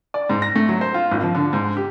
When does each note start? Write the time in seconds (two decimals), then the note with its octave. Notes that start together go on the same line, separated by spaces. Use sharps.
0.14 D5
0.30 G#2
0.42 A#6
0.55 A3
0.69 F#3
0.81 C5
0.94 F4
1.11 G#1
1.23 F3
1.35 D3
1.53 G#2
1.77 G4